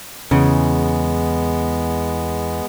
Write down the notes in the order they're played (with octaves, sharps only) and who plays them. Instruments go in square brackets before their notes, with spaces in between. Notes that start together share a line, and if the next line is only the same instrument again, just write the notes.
[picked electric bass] E2 [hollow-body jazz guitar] C#3 [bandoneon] G#3 B3